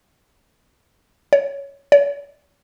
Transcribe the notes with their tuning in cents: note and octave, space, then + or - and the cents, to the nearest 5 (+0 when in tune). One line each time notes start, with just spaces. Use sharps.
C#5 +5
C#5 +40